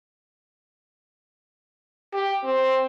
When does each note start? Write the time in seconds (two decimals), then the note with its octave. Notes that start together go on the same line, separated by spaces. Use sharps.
2.13 G4
2.44 C4